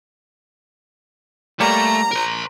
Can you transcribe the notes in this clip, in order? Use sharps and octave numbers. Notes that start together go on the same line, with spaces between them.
G3 A3 A#3 C#5 A#5
A#4 C5